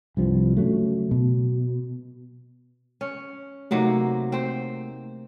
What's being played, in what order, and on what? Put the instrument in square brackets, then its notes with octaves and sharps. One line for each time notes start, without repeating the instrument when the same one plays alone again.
[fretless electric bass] C2 G2 F3
C#3 F#3 A3
B2
[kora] C#4
[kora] C3 F#3 A#3 [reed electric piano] A3 D#4
[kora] C4 C5